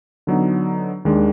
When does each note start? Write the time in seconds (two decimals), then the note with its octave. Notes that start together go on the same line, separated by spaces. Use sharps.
0.27 D3 F#3 B3 D#4
1.05 D#2 D#3 G#3 D4